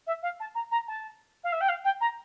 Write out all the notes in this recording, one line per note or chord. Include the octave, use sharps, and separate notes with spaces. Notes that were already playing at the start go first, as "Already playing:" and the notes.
E5
F5
A5
A#5
A#5
A5
F5
E5
G5
F5
G5
A#5